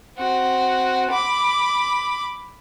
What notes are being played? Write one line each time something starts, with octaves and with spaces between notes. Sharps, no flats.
C4 F#4
B5 D6